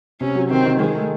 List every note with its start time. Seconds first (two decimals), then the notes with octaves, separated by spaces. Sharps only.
0.21 C3 C#4
0.35 F#3
0.50 D#3 C4
0.66 D#3
0.80 D#3 G#3
0.95 A3